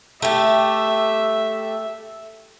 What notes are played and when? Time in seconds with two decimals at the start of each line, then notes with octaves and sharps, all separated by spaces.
0.22 A3 G4 E5